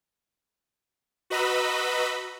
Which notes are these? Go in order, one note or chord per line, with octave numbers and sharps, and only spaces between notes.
F#4 B4 D#5 A#5 B5 E6